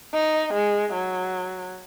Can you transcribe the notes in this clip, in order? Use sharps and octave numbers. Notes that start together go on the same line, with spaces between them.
D#4
G#3
F#3